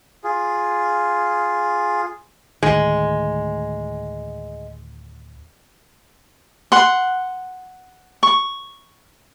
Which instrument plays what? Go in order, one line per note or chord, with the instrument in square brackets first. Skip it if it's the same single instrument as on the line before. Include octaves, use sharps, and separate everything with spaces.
[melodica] F4 G#4
[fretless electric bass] D2 A2 D#3 [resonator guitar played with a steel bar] G#3
[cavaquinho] F#5 C6
C#6